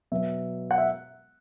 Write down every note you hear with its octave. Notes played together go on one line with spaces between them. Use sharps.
B2 F#3 B3 E5
F#5
E5